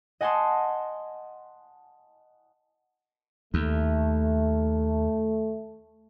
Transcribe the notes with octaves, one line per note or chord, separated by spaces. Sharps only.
D#5 F#5 G#5 A5 C6 D#6
D#2 A3